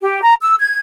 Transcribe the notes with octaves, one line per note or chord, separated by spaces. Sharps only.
G4
A#5
E6
G#6